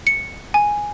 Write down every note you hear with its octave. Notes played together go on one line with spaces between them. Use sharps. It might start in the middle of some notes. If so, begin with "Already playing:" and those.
C#7
G#5